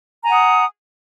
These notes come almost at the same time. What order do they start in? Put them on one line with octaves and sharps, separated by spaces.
A#5 G#5 F#5 D#6